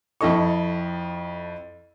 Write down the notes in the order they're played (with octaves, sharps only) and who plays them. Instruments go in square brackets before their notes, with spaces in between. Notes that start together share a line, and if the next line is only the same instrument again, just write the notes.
[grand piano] F2 E4 A4 D#5 C#6